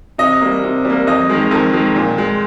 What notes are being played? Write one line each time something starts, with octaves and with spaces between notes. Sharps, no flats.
C3 D#5
G3 A#3
C3
G3 A#3
F2 D#5
D#3 G#3
F2 A#4
D#3 G#3
A#2
G#3